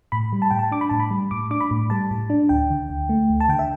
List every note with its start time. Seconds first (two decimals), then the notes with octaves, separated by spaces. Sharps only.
0.12 A2 B5
0.33 G3
0.42 A5
0.51 A2 G5
0.59 A5
0.72 D4 D6
0.81 B5
0.89 A2 A5
1.00 B5
1.11 G3
1.31 A2 D6
1.51 D4 D6
1.61 B5
1.71 A2
1.90 G3 A5
2.11 A2
2.30 D4
2.49 D2 G5
2.70 D3
2.90 D2
3.09 A3
3.30 D2
3.40 A5
3.48 D3 G5
3.59 E5